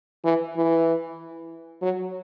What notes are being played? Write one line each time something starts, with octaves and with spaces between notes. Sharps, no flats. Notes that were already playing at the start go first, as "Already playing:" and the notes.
E3
E3
F#3